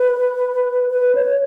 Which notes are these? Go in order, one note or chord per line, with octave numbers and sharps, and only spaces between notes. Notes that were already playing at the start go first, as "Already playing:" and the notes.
Already playing: B4
B4
C#5